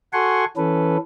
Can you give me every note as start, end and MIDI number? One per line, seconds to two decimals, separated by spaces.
0.13 0.45 66
0.13 0.45 69
0.13 0.45 78
0.13 0.45 80
0.13 0.45 84
0.13 0.45 85
0.57 0.97 52
0.57 0.97 61
0.57 0.97 69
0.57 0.97 71